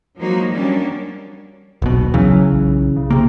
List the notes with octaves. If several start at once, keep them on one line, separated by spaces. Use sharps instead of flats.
F3 F#3 G#3 A#3 D#4 F#4
D#3 F#3 G3 A#3 C#4 D4
D#1 B1 B2
C#3 E3 F#3
B1
C#3
C3 A#3